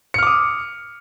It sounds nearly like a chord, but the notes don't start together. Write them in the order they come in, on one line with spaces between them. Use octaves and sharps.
C#7 F6 D6 D#6